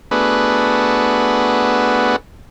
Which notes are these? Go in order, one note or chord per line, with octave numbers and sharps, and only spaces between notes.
A3 B3 D4 F#4 G#4 B4